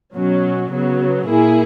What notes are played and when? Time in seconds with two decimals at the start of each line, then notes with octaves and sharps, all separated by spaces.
0.16 B2 F#3 C#4
0.72 C#3 F#3 B3
1.28 A#2 A#3 E4 G#4